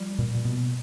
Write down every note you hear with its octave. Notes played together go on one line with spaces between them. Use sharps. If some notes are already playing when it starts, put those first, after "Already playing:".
Already playing: F3 G3
A#2
B2